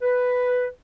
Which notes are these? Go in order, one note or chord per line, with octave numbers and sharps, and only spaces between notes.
B4